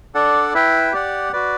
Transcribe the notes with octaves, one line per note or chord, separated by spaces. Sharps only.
D4 A4 D5 F#5
E4 B4 E5 G5
G4 D5 F#5
F#4 B4 D5